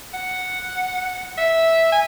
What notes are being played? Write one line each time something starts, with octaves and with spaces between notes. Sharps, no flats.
F#5
E5
G#5